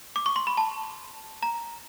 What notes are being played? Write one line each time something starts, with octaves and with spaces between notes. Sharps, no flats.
D6
C#6
C6
B5
A5
A#5